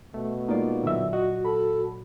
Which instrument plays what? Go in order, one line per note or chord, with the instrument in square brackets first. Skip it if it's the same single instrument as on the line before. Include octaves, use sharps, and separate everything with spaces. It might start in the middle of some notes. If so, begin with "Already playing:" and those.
[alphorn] B2 [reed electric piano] A3
[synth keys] G#3 A#3 D#4 [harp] F4 D5 F5
[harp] A#2 F#3 [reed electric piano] D3 E5
[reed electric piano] F#4 [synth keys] D#5
[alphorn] A4 [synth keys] B5